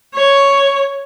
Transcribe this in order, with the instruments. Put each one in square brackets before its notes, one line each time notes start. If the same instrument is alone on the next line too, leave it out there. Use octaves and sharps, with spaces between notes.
[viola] C#5